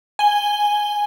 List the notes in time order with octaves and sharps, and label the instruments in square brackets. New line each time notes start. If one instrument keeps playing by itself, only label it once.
[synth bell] G#5 G7